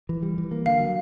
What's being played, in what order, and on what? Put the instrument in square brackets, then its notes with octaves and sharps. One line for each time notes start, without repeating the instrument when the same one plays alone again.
[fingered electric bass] E3
G3
E3
A#3
[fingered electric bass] D3 [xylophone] F5
[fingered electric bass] F#3